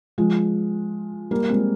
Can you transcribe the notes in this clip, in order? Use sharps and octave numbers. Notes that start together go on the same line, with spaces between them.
F3 G#3
G3 A#3
G#3 C4